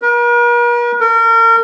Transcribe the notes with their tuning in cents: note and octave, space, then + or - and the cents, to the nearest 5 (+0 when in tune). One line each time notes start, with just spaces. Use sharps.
A#4 +45
A#4 -35